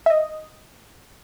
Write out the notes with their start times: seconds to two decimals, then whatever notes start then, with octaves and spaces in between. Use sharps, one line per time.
0.06 E5
0.10 D#5